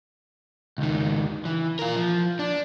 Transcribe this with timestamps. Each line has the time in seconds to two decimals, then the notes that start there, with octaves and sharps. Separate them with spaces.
0.78 C#2 D#3
1.45 E3
1.79 F4 A#4
1.96 F3
2.39 D4